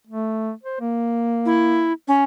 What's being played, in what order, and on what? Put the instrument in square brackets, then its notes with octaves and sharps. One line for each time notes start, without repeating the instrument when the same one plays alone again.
[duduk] A3
C5
A#3
[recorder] E4
C#4